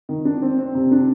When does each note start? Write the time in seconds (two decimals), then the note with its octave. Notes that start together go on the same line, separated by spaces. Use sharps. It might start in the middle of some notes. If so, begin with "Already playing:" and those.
0.09 D#3
0.25 D4
0.42 C4
0.58 C4
0.75 C3
0.91 D4